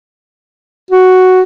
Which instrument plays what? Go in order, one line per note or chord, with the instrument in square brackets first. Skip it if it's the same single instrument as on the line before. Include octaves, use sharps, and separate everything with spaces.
[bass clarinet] F#4